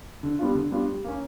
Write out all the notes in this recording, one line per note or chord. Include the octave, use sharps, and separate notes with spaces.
D3
G3 B3 D4 F4
D3
G3 B3 D4 F4
G3
A#3 C#4